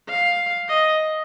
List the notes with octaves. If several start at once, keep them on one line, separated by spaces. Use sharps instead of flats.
F5
D#5